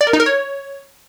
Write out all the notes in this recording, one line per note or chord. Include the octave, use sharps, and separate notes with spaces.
D5
A#4
D#4
A#4
C#5